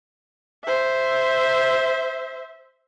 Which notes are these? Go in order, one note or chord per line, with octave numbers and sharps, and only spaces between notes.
C5 E5